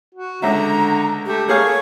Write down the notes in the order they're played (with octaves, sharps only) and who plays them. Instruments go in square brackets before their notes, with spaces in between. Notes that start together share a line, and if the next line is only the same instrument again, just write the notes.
[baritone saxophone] F#4
[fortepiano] C#2 E5 [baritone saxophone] D3 [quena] A#5
[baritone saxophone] A3 [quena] G4
[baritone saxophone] A3 [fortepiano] A#3 G#4 F5 [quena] C#5